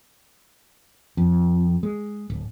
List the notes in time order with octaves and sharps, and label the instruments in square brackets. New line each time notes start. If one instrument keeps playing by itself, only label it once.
[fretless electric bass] F2
G#3
D1